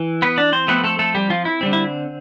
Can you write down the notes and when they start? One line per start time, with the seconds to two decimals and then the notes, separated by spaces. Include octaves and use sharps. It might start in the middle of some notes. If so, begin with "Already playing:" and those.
Already playing: E3
0.22 B3 B4
0.38 D4 D5
0.52 C4 C5
0.68 F3 A3 B3 C4 B4
0.84 A3 A4
0.99 A3 A4
1.15 G3 G4
1.30 F3 F4
1.45 E4
1.61 D3 G3 C4
1.73 E4